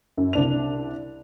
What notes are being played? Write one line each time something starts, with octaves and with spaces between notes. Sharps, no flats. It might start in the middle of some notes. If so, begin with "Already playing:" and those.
F#2
C2 D4 F7